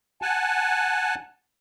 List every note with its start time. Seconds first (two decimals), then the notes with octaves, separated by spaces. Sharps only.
0.22 F#5 G#5 A5